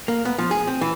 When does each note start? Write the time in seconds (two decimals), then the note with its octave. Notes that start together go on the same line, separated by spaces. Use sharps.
0.08 A#3
0.25 B3
0.38 F3
0.51 G#4
0.67 C4
0.81 E3